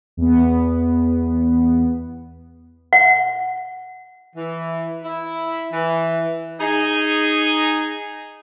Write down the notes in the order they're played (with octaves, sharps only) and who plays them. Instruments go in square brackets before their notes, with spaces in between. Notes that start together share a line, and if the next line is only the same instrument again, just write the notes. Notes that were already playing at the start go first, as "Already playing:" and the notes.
[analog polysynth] E2 B3
[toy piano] F#5
[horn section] E3
E4
E3
D#4 G#4